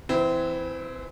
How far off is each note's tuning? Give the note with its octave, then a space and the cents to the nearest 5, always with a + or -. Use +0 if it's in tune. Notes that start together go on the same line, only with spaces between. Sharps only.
E3 +0 C4 -25 E4 +0